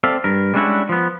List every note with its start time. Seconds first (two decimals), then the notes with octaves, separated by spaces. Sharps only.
0.04 C4 A4 D5 E5 F5
0.24 G2 A#4
0.54 G3 G#3 C#4 D4 E4 F#4
0.89 F3 B3